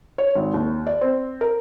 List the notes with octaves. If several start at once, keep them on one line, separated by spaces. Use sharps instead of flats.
C#5
G#1
D#2
D5
C4
A#4